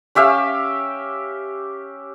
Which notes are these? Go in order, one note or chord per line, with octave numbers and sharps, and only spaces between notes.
C#4 G4 E5 F5